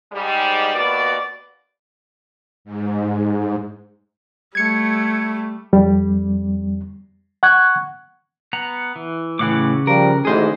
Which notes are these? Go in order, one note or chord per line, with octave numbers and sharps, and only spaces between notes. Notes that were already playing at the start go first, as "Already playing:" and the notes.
G#2 G3
D#2 B2 A#3 B3 F#4 D5
G#2
G3 A3 G#6 C#7
F2 G3
F#5 C#6 F#6 G#6
B3 F#5 A#5
E3
A2 C#3 E3 F#5 D6
F3 G3 A#4
A1 G#2 D#3 G#4 C5